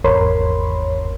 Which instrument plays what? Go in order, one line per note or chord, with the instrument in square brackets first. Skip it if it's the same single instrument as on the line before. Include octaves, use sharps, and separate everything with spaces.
[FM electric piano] G#1 E2 A#4 C#5 B5 C6